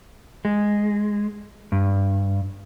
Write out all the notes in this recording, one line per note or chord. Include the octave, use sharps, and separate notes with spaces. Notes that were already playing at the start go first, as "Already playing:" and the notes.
G#3
G2